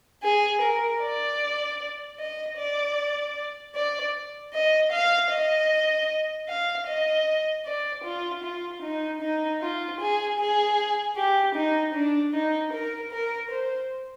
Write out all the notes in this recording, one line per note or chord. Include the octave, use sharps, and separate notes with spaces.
G#4
A#4
D5
D#5
D5
D5
D#5
F5
D#5
F5
D#5
D5
F4
F4
D#4
D#4
F4
G#4
G#4
G4
D#4
D4
D#4
A#4
A#4
C5